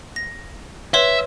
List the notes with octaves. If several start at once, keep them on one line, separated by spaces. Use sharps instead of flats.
A#6
B4 C#5 E5 C6